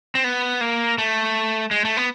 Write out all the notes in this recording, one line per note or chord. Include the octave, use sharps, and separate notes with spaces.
C4
B3
A#3
A3
G#3
A3
B3